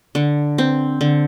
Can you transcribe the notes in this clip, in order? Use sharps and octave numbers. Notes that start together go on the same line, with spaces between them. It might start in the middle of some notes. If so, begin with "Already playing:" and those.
D3
C4
D3